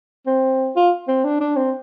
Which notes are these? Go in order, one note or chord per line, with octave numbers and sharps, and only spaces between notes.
C4
F4
C4
D4
D4
C4